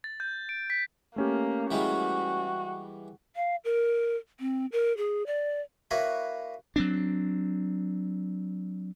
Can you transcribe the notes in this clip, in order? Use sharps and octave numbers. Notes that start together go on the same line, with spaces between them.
A6
G6
D7
B6
A3 A#3 C#4 G4
E3 G3 G#3 F#4
F5
A#4
C4
A#4
G#4
D5
A#3 E4 F#4 B4 C#5
F#3 C4 D4